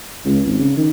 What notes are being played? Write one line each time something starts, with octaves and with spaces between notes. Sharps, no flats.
C#2
G#1
C#3
D#3